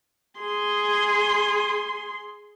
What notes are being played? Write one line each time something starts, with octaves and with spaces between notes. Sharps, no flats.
G#4 C6